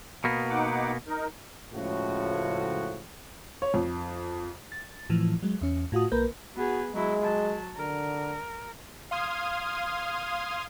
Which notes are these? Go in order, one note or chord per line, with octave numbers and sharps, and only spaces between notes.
B2 A#3 B3
D#4 F#5 D6
D#4 A#4
C#2 A2 F3 F#4
C#5
F2
A6
A2 E3 F3
F#3 G#3
E2 C#4
A2 F4 F#4 D#6
B1 A#3 A#4 B4 G6
B3 F#4 G#4
F#3 G#3 E4
F#3 A5
D3 A#4
F5 C6 D#6 F6 G#6 D#7